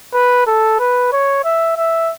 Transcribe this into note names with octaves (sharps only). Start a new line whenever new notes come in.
B4
A4
B4
C#5
E5
E5